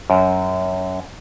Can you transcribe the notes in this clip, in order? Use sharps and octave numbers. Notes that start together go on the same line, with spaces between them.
F#2